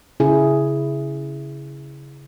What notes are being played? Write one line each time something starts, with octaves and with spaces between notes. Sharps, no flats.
C#3 E4 G#4